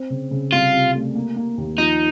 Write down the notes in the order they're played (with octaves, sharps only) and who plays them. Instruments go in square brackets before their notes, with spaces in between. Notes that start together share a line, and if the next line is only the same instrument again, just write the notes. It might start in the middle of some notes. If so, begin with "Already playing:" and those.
Already playing: [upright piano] C4
C#3
C#3
[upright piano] C2 [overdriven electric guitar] F4
[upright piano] C3
A3
A#3
A#3
D#2
[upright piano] F3 [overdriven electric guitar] D#4